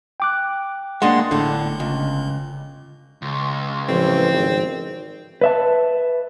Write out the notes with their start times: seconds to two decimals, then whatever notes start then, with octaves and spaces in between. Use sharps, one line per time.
0.20 G5 D6 F#6
1.02 G#3 A#3 D4 F#5 C6
1.31 G1 A2 D3
1.80 C#2
3.22 C#2
3.88 A1 F3 C4
4.34 G#1
5.41 B4 E5 A5